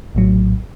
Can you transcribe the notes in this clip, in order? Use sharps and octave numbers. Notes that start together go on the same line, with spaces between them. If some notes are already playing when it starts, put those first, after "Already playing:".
A#1 A2 F#3